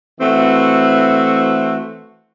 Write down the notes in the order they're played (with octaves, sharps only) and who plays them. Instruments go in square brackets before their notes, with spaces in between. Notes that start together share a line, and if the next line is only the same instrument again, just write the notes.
[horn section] E3 A3 C4 F#4